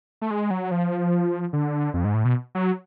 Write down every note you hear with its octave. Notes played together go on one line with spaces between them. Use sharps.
A3
G#3
F#3
F3
D3
F2
G#2
A2
B2
F#3